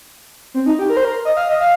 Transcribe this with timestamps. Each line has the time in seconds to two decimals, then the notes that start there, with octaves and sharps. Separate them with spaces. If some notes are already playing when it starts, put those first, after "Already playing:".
0.54 C4
0.66 D#4
0.79 G4
0.89 A#4
0.97 C5
1.05 A#4
1.25 D#5
1.37 F5
1.49 D#5
1.61 F5